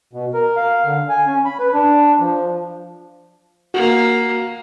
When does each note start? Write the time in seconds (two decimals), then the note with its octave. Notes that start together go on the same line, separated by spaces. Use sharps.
0.13 B2
0.34 A#4
0.57 F5
0.85 D3
1.09 G#5
1.26 C#4
1.45 B5
1.60 B4
1.73 D4
2.20 F3
3.74 A#3 F#4